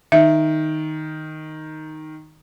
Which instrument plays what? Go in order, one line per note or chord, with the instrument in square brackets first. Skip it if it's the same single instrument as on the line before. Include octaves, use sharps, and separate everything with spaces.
[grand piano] D#3 [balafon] E5